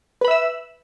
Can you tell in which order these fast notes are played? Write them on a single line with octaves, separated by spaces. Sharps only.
B4 B5 E5 E6